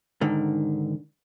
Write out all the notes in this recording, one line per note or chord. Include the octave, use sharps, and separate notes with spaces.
G#2 D3 D#3